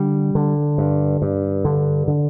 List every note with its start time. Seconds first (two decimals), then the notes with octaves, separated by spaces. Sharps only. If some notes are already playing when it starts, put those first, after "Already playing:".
Already playing: D3 G3
0.35 D3
0.78 G2
1.22 G2
1.65 D3
2.08 D3